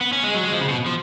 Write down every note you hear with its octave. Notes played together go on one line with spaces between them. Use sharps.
B3
C#4
G#3
F#3
G#3
F3
C#3
B2
F3